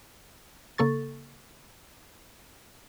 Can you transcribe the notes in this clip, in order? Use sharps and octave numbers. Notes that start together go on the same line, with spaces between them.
C#3 A#3 A4 C#6 A6